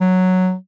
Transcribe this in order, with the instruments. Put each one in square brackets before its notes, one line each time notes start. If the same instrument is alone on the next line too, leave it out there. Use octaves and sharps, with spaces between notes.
[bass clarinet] F#3